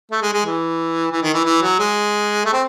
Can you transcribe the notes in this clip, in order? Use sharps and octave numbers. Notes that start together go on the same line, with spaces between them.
A3
G#3
G#3
E3
E3
D#3
E3
E3
F#3
G#3
A3
C4